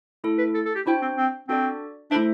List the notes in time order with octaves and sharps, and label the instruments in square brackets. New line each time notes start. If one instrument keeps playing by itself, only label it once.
[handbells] A3 E4 A4
[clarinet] B4
A4
A4
G4
[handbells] D4 F#4 C5 G5 [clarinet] E4
[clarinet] C4
C4
[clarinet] C4 [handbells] D4 F#4 A4 D5
[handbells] A3 E4 A4 C5 E5 [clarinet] D4